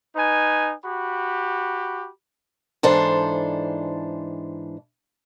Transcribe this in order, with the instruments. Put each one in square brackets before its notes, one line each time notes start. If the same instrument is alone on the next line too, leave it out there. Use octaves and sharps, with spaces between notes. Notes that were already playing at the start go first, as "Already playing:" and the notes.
[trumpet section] D#4 B4 G#5
F#4 G4 B5
[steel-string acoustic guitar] G#2 E3 D4 A4 C5